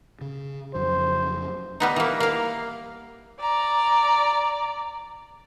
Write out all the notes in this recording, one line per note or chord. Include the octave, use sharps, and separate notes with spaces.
C#3
F2 C#3 F#3 C5
G3 B3 D#4
E3 A#3
A#3 F5
D5 A#5